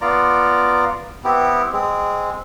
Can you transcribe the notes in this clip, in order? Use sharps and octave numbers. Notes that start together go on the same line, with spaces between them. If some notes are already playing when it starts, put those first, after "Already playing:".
B3 F4 D5 A#5
B3 C4 E4 G4
G#3 C4